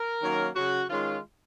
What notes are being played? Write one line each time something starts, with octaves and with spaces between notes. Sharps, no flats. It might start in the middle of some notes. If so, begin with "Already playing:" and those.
Already playing: A#4
D#3 F#3 A#3 C#4
C#3 F#3 C#4 F#4
D#3 G#3 C#4 F4